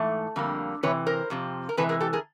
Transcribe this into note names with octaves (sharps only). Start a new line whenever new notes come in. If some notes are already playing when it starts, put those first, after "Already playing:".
Already playing: G#2 E3 A3
F2 D3 G3 A#3
C3 E3 B4 C#5
A#4 C5
F2 C3 F3
A#4
C3 E3 G#3 A4 B4
G#4 A#4
G4 A4
G#4 A#4